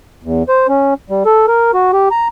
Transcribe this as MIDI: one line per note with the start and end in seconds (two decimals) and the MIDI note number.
0.23 0.43 40
0.49 0.67 72
0.69 0.94 61
1.10 1.23 55
1.26 1.46 69
1.48 1.71 70
1.74 1.91 66
1.93 2.09 67
2.11 2.28 82